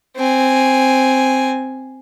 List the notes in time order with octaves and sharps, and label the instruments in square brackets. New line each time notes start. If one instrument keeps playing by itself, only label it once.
[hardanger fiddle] C4 G#5